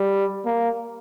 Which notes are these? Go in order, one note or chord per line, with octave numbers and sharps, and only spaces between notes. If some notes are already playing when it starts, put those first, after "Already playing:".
Already playing: G3
A#3